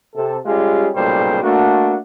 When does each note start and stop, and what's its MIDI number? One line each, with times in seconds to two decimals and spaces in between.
0.16 0.38 48
0.16 0.38 69
0.46 0.89 55
0.46 0.89 56
0.46 0.89 61
0.46 0.89 65
0.46 0.89 67
0.46 0.89 68
0.96 1.40 35
0.96 1.40 46
0.96 1.40 49
0.96 1.40 55
0.96 1.40 57
0.96 1.40 72
1.42 1.97 57
1.42 1.97 58
1.42 1.97 62
1.42 1.97 66